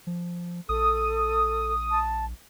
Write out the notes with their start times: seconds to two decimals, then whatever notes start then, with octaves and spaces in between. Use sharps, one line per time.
0.07 F3
0.69 A#1 A4 D#6
1.91 A5